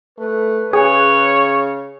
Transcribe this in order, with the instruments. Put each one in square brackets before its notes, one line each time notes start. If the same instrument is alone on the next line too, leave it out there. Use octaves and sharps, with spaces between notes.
[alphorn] A3 [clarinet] B4
[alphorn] C#3 [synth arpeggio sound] G#4 [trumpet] C#5